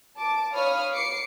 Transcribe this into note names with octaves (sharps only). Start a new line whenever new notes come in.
A5 D6
C#5 F5 B5 D#6 F6
D6 C7 C#7